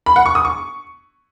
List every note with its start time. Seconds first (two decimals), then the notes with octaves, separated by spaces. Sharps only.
0.06 B5
0.16 F#5
0.26 C#6
0.35 D#6
0.45 C#6